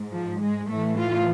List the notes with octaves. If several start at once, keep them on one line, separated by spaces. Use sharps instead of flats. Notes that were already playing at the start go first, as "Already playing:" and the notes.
Already playing: G#2
F3
G#3
A2 E3 A3
F4